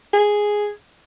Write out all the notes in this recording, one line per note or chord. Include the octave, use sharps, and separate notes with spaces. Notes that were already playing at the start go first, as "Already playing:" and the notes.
G#4